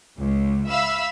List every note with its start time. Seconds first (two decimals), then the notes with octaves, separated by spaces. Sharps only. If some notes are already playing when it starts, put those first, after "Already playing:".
0.18 C#2
0.69 E5 F5 B5 E6